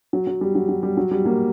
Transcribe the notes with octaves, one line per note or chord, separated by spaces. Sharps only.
F#3
F#3
G3
F#3
F#3
G3
F#3
G3
F#3 A#3